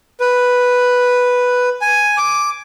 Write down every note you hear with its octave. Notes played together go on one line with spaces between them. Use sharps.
B4
G#5
D6